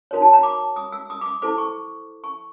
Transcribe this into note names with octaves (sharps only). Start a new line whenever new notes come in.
D#4 F#4 A#4 C#5
A5
A#5
D6
D#6
E6
D#6
D6
D#6
E4 A4 C5 D6
C#6
C#6